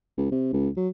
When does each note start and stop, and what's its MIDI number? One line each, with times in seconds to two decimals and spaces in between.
0.18 0.28 37
0.31 0.53 48
0.53 0.69 37
0.77 0.89 54